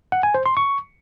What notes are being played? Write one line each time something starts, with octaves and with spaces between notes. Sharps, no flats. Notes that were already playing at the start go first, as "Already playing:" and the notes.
F#5
G#5
C5
C6
C#6